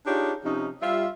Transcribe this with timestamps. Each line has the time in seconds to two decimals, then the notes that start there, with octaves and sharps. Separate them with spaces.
0.06 D4 D#4 F4 G4 G#4 C#5
0.44 C3 F3 C#4 D#4
0.82 G3 F4 E5